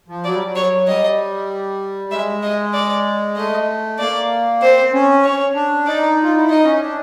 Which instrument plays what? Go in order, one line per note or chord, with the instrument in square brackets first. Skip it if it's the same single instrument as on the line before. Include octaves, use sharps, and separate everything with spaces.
[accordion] F3
[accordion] F#3 [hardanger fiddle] D5
[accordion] G3
F#3
[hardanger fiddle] C#5
[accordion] G3 [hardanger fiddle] D#5
[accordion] G#3 [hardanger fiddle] E5
[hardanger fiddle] D#5
D5
[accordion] A3 [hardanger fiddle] D#5
[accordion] A#3 [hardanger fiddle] D5
[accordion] C4 [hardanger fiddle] C5
[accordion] C4
C#4
[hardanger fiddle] C#5
[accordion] D4
[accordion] D#4 [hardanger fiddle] D5
[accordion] F4
E4
[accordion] D#4 [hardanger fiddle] D#5
[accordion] C#4
D#4
D4